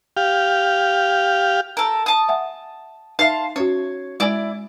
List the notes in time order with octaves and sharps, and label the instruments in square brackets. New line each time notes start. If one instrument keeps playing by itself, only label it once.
[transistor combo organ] G4 F5
[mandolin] A4 A#4
A5 D#6
[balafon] E5 F#5 G#5
[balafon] D#4 E5 [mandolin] F5 A5 C6
[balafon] C#4 F#4 [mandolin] C#5
[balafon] G#3 G#5 [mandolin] E4 D5